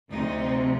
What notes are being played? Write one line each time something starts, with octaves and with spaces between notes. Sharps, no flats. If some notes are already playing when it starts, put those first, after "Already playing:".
D2 C3 F3 D#4